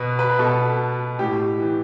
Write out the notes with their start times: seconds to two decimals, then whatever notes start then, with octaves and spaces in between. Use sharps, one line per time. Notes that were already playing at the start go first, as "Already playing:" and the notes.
Already playing: B2 B4
0.19 B4
0.39 B2 A4
1.19 A2 G4
1.60 E3